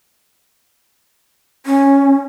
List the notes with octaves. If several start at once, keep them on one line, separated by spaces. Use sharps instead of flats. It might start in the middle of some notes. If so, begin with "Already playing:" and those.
C#4